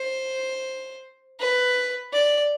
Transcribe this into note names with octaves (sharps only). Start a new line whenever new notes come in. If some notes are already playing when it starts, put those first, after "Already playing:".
Already playing: C5
B4
D5